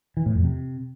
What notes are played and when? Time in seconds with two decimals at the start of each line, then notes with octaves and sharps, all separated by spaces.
0.17 E3
0.26 A2
0.35 F2
0.44 C3